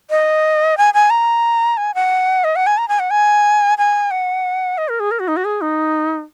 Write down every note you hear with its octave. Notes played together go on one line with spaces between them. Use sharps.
D#5
G#5
G#5
A#5
G#5
F#5
D#5
F#5
G#5
A#5
G#5
F#5
G#5
G#5
F#5
D#5
A#4
G#4
A#4
F#4
D#4
F#4
G#4
D#4